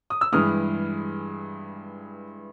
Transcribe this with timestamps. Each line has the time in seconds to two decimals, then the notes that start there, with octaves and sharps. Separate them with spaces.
0.10 D#6
0.21 E6
0.32 G2 E3 G#3 D#6 F6